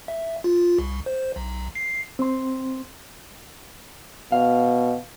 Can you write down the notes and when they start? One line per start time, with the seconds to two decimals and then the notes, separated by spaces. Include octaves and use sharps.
0.08 E5
0.44 F4
0.79 C2
1.06 C5
1.36 B1
1.75 C7
2.19 C4 C6
4.32 B2 F5